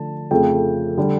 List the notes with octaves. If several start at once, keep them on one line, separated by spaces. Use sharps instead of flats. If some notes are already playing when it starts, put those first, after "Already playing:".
Already playing: D3 F3 A3 A5
F2 C#3 F3 A3 G5
D3 G3 D4